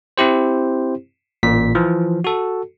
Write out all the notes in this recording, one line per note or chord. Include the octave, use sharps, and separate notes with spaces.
C4 E4 G4 C5
A1 A#2 B6
E3 F3
F#4 A4